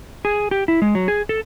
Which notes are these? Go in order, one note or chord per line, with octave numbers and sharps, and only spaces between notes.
G#4
G4
E4
G#3
F#3
G#4
A4